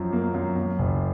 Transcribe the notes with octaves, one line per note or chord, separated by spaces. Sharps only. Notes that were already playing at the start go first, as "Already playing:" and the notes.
Already playing: F#2 F3
A#3
F#2
F#2
F#1